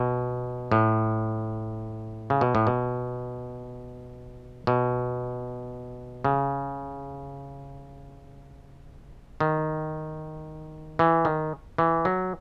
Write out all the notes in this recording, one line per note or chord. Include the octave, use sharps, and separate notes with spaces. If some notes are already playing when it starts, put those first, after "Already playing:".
Already playing: B2
A2
C#3
B2
A2
B2
B2
C#3
D#3
E3
D#3
E3
F#3